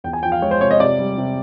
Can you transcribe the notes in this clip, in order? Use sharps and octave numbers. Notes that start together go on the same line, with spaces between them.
E2 G5
G#5
F3 G5
F5
G#3 C#5
C5
C3 C#5
D#5
C3 D5
G3
C3